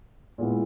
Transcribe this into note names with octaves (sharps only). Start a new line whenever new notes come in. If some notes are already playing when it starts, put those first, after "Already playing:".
A#2 G#3 B3 E4